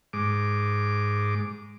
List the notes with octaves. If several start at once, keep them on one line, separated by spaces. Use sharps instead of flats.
G#2 D6